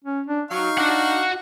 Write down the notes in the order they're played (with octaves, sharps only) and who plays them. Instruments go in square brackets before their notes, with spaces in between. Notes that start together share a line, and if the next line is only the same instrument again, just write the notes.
[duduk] C#4
D4
[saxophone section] F#3 [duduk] D#4 [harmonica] F5 C#6
[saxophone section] D4 [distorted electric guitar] F#4 F#5